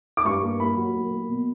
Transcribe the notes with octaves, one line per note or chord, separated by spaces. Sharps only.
D6
G2 C#6
A#3
A#3 B5
F#3
A#3
A#3
B2